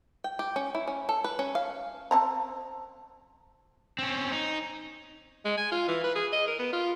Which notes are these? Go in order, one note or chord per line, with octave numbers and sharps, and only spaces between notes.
G5
G4
C#4
E4
C#4
A4
B4
C#4
F5
C4 A5 A#5
C4 C#4
D#4
G#3
G#5
F4
E3
B4
G#4
D#5
A#4
B3
F4